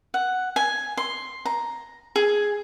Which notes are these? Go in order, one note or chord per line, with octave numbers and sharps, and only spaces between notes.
F#5
G#5
C6
A#5
G#4